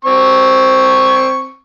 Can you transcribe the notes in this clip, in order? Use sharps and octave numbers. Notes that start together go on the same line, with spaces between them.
C4 C#6